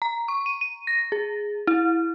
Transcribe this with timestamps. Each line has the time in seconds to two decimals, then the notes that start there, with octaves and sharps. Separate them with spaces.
0.02 A#5
0.28 C#6
0.46 D#7
0.61 D#7
0.87 A#6
1.12 G#4
1.67 E4